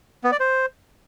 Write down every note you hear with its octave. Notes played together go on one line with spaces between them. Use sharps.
B3
D5
C5